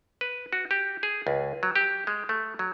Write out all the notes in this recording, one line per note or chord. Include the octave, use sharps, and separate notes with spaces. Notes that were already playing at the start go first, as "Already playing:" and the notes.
B4
F#4
G4
G#4
C#2
F#3
G4
G#3
A3
F#3